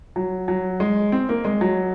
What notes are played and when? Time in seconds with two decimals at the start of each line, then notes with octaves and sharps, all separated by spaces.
0.16 F#3
0.48 F#3
0.80 G#3
1.12 C4
1.29 A#3
1.45 G#3
1.61 F#3